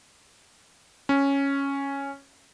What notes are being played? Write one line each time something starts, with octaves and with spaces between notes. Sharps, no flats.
C#4